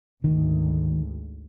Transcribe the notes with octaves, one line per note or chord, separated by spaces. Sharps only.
G#1 D2 D#3